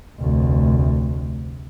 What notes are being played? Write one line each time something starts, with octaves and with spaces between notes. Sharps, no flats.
F1 D2